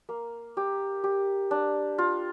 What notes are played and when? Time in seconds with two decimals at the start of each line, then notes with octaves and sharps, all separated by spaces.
0.09 A#3
0.57 G4
1.04 G4
1.51 D4
1.98 F4